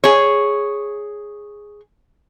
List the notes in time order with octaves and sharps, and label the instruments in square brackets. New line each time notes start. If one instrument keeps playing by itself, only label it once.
[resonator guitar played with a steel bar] G#4 C#5